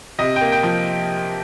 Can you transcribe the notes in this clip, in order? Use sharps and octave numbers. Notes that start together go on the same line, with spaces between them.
C3 D#5
G5
A#3
G5
F3